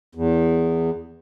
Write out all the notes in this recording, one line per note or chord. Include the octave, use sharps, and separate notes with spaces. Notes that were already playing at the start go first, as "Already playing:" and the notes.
E2